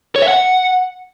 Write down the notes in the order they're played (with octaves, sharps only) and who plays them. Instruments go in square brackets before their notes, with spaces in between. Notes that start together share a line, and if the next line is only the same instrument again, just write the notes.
[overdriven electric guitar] C#5
E5
F#5